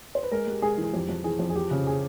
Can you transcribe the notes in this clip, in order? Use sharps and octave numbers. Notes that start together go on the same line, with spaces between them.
C5
B4
G#3 A#4
G#3 G4
G#3 G#4
E3
G#4
F2 G4
F2
E3 G#4
F2
G#4
F3 G4
C#3
G#4